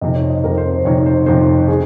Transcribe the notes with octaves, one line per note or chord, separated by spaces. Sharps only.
F2 C3 D#3 D#5
C#5
D#5
F2 C3 D#3 A#4
C5
C5
F2 C3 D#3 C#5
C5
F2 C3 D#3 C5
D#3 G#4